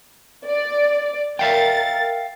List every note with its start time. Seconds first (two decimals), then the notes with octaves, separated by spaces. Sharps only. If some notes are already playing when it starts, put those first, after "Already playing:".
0.46 D5
1.39 A#4 E5 F5 G5 A6